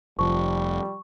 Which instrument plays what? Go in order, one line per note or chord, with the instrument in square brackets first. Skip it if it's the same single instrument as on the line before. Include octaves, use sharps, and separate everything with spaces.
[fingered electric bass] F1 [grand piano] F3 [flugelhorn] G3 [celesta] C#6